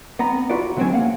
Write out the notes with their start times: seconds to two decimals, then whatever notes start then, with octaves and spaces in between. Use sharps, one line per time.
0.19 B3 C4 F#5 A#5 B5
0.50 F4 F#4 B4 D5
0.77 D3 F#3 G#3 C4 C#4 G#5
0.92 A#3 F5 F#5